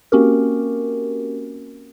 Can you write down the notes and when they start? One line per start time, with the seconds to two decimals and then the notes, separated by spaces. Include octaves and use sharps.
0.12 A#3 C4 C#4 F#4 G4 A#4